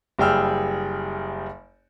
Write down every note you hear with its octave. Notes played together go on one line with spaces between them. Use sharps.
F#1 G3 G#4 G5 E6 F6